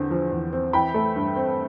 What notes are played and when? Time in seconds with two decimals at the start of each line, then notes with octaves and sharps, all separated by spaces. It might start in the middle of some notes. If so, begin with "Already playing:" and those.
Already playing: E2 D3 C4
0.11 F3
0.31 E2
0.53 C4
0.73 E3 G5 B5
0.94 A3
1.16 G2
1.36 C4